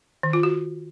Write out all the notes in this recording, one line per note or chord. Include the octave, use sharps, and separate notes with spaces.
D#3
F4
F#4